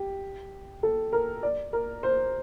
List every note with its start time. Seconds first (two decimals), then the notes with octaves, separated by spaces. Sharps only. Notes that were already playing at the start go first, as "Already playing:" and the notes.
Already playing: G4
0.83 A4
1.13 A#4
1.43 D5
1.73 A#4
2.03 C5